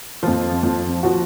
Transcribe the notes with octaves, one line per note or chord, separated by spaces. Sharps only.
F2 F3 F4
F2 F3
F3 F#4